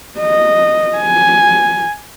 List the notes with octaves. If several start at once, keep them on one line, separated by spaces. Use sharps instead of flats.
D#5
G#5